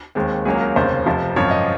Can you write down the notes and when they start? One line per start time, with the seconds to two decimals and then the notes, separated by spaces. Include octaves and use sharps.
0.15 D#2 D#3 G#3 C4
0.45 C#2 C#3 F#3 A#3 G#4
0.61 A#4
0.76 F1 D#2 C#3 C5
1.06 F1 F2 C3 F3
1.36 G#1 F#2 F3 C4 C#5
1.51 D#5